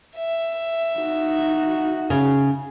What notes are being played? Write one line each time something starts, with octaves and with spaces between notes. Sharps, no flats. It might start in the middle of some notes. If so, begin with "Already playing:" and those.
E5
D#4 F#4
C#3